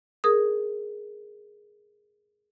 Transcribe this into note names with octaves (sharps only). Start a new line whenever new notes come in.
G#4 A#4 D#6